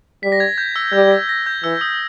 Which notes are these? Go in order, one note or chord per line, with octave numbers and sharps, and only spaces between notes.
G3 B6
A#6
G#6
G6
E6
G3 G6
A#6
A#6
G6
E3 E6
D#6